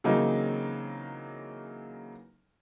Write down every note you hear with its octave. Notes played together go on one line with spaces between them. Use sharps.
C#3 E3 F#3 A#3 C4 D#4